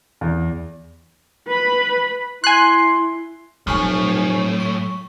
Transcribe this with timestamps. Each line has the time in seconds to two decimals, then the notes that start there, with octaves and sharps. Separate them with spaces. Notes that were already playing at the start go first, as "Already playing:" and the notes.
0.21 E2
1.47 B4 B5
2.44 E4 G#5 C6 F#6
3.67 F1 A2 F#3 G#5 C#6 F6
4.60 C#6